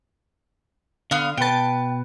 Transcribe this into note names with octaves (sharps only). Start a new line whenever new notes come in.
D3 B3 F5
B2 B4 G5 A5